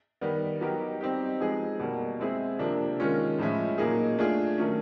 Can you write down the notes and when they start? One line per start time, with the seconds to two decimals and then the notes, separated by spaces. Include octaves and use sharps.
0.21 D#3 G3 B3
0.61 F#3 B3 D#4 G4 A#4
1.01 G3 C4 D#4 G4
1.40 F3 G#3 B3 D#4 G#4
1.79 B2 G3 A#3
2.20 G#3 C4 E4 G#4
2.59 C3 F3 A#3 D4
3.00 D#3 G#3 C#4 F4
3.39 A2 F3 G#3 C#4 E4
3.78 A#2 F#3 A#3 D#4 G#4
4.18 A3 D4 F4 G#4
4.57 D#3 F#3 A3 C#4